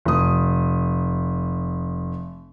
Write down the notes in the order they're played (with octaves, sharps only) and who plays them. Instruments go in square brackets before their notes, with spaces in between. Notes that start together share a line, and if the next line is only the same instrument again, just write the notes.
[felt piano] F1 D#6